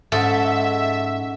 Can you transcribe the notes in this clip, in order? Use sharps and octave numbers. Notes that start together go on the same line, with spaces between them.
G#2 C#4 A4 E5 F#5